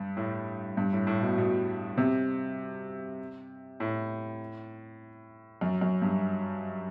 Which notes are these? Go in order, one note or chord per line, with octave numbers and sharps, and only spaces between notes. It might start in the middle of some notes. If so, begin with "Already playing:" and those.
Already playing: G2
A2
G2
A2
A2
B2
B2
C3
A2
F#2
F#2
G2